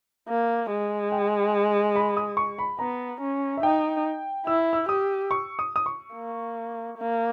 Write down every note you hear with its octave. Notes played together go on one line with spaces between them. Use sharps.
A#3
G#3
G5
B5
D#6
C#6
B5
B3 A#5
C#4
E5
D#4 G5
E4 E6
E6
G4 D#6
C#6
D#6
D#6
C#6
A#3
A#3